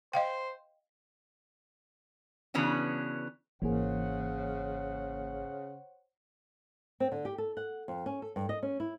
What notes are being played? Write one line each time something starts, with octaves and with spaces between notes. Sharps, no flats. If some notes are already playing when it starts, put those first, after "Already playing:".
C5 D#5 F5 G5
C#3 E3 B3 C#4 D4 F#4
G#1 C#3 E3 A#3 G#4 C5 C#5 F#5
C4
D3
G4
A4
F#5
F2
C#4
A4
G2
D#5
C#4
E4